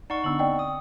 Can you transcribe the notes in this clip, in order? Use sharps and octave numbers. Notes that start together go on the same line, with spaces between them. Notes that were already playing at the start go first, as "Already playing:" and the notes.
D#4 D5 F#5 C#6
D3 B3 D4 E6 F#7
B3 C4 D5 D#5 G5
D#6